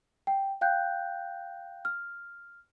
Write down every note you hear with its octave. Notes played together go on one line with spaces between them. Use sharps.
G5
F5 G5 F#6 G6
F6